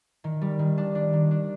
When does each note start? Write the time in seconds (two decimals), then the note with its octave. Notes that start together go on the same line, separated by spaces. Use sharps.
0.24 D#3
0.41 G3
0.59 D#3
0.78 D4
0.95 D4
1.13 D#3
1.31 D4